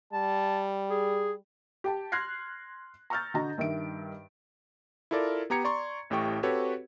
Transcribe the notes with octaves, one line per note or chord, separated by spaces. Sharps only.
G3 A5
G#4
G4 G5 A5
C6 F6 F#6 G#6 A#6 C7
A#5 C#6 E6 F6 G6 A6
D3 F#4 D#5 A#5
G2 D#3 E5 D7
E4 F4 A4 A#4 D5
B3 G4 A#5 G#6 C#7
D5 A#5 C6 C#6
A1 A2 G4 G5 C#6
C4 F#4 G4 A4 B4 C#5